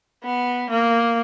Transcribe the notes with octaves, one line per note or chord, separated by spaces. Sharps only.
B3
A#3